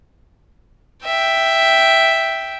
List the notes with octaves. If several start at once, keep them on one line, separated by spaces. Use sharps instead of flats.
E5 G5